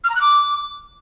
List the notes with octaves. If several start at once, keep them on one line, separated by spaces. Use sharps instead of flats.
F6
A#5
F#6
D6